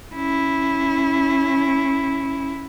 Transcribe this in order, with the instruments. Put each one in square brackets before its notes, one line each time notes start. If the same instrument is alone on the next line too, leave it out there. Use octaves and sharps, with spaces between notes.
[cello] C#4 E4